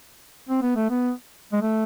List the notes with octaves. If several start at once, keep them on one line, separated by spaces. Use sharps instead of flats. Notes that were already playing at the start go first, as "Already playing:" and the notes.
C4
B3
A3
B3
G#3
A3